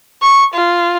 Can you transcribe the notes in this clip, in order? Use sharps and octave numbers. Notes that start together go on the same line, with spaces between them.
C#6
F4